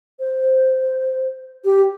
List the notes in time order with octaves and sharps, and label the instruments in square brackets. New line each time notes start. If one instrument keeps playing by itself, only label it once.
[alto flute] C5
G4